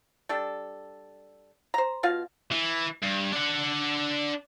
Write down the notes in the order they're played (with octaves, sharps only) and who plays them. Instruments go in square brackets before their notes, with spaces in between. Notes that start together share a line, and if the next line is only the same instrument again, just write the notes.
[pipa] G3 D4 A4
C5 A#5
B2 F4 F5
[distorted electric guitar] E3
G2
D4 F#5